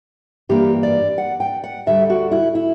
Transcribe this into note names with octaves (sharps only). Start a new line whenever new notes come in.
G2 E3 A#3 D4 G4
D5
F#5
G5
F#5
D2 D3 G3 E5
F#4
E4
E4